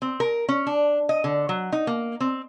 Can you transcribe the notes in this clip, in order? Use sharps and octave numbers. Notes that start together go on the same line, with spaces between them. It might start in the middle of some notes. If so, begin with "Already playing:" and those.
C4
A#4
C#4
D4
D#5
D3
F#3
D#4
A#3
C4